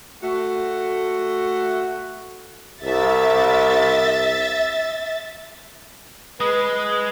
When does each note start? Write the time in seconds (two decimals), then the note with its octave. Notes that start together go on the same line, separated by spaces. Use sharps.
0.23 A3 F#4
2.84 C2 E5 A6
6.40 G#3 B4 D#6